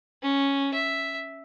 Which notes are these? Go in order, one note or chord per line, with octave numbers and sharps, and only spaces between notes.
C#4
E5